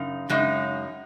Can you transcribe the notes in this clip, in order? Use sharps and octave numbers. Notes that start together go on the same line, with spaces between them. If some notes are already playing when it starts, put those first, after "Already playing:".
Already playing: F#2 C#3 D#4
F#2 C#3 G#3 D#4